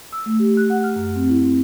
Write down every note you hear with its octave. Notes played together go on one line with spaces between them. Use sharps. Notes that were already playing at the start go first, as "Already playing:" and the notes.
E6
A3
G4
F#6
F#5
F6
F#2
C4
E4
C4